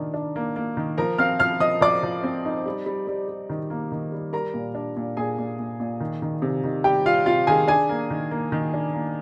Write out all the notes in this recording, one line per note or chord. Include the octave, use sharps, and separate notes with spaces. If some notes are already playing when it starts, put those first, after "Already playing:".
Already playing: D#3 A#3 D4
D4
A#3
A#3
D#3
F3 A#4 A#5
C4 F5 F6
F3 F5 F6
F3 D#5 D#6
F3 D5 D6
F3
C4
D#4
G3
G3
G3
G3
D#3
A#3
D#3
G3
G3 A#4 A#5
A#2
D4
A#2
A#2 G#4 G#5
A#2
A#2
A#2
D#3
D#3
C3
D#3
G3 G4 G5
G3 F4 F5
C3 F4 F5
D#3 G#4 G#5
D4 G#4 G#5
A#3
D#3
A#3
D#3
D4
A#3